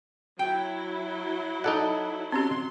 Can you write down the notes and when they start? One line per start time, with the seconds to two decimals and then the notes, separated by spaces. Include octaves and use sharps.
0.39 F#3 E4 G5
1.64 D#4 A4 D5 F#5
2.32 F#3 C4 C#4 G4 C6